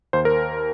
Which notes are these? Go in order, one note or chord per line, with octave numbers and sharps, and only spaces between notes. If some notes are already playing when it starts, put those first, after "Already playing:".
D#2 C5
A#4